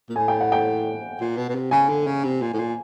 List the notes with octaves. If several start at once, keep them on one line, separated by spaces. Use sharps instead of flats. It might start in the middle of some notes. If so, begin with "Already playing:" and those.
A#2
A2 G#5
G5
F#5
G5
A#2
B2
B2
C3
C#3 G#5
D3
C#3
C3
A#2
A2
A#2